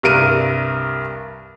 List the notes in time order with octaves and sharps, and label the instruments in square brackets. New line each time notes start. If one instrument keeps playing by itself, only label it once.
[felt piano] C2 G2 A#4 D7 D#7